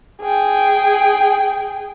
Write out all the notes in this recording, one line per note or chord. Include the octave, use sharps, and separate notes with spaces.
G#4 G5